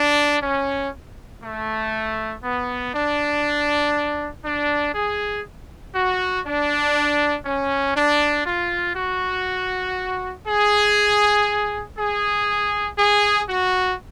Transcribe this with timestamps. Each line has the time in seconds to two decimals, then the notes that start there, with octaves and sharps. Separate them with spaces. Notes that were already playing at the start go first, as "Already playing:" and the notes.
Already playing: D4
0.43 C#4
1.43 A3
2.44 B3
2.94 D4
4.44 D4
4.94 G#4
5.95 F#4
6.45 D4
7.45 C#4
7.96 D4
8.46 F4
8.96 F#4
10.47 G#4
11.97 G#4
12.97 G#4
13.48 F#4